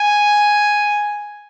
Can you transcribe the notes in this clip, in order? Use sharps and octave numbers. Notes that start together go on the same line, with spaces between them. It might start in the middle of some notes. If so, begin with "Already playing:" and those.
Already playing: G#5